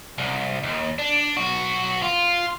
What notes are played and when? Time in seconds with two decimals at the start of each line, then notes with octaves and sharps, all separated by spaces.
0.18 C2
0.63 D#2
0.98 D4
1.36 B1 F#4
2.02 F4